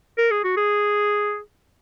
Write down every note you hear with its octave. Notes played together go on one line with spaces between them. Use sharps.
A#4
G#4
F#4
G#4